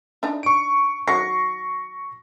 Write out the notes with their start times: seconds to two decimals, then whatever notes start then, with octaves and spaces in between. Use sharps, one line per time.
0.23 D4 D#4
0.43 C#6 D7
1.08 D#3 F#3 C#6 A#6 C7